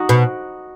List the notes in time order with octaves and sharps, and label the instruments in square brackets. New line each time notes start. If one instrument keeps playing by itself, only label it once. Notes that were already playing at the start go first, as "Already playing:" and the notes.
Already playing: [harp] D#4 F#4
[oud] B2